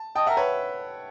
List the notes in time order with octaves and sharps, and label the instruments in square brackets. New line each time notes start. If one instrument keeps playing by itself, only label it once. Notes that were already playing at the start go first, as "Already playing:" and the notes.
Already playing: [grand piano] A5
[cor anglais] D#5 [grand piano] G5 A5
[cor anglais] A#4 [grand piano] E5 F#5
[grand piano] B4 C#5